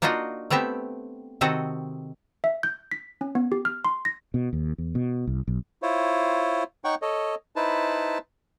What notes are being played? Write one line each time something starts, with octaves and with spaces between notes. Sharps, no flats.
A#3 D4 D#4 F4 F#4 D#5
A3 B3 C4 G4 E5
C3 D#3 C4 F#4 A4 D#5
E5
G6
B6
C#4
B3
G4
F6
C6
A#6
B2
D#2
E2
B2
C2
B1
E4 F4 C5 C#5
D#4 C#5 F#5 G5 C#6
A4 C#5 D#5
D#4 E4 B4 C5 A5